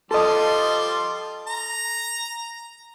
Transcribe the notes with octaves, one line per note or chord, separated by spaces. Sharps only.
F3 G3 A4 D#5 C6
A#5